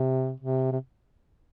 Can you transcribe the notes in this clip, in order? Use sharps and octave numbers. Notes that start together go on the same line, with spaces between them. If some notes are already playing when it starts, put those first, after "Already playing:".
Already playing: C3
C3
C3